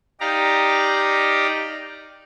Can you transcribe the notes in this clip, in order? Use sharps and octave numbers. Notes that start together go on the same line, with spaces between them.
D#4 G4 D5 F5 A#5